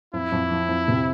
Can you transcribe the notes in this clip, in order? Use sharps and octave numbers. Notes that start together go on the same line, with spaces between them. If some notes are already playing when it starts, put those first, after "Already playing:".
F2 E4
F2
F3
F2
C3